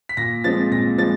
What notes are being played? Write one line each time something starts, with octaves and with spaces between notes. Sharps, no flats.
B6
A#2 A#6
F3 G#3 C4 A6
A#2 A#6
F3 G#3 A6